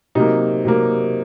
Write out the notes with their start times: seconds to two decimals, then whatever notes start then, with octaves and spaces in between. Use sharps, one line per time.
0.15 C3 F#3 A#3 D#4
0.65 C3 F#3 A#3